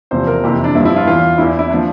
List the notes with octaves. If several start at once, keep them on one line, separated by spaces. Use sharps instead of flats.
E2 C3 F3 C5
A#4
F2 C3 E3 G4
D4
G2 F3 E4
E4
F4
E2 E3 F4
E2 E3 E4
E4
F3 D4